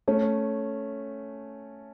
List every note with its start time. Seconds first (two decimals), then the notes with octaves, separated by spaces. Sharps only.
0.08 A3 C#4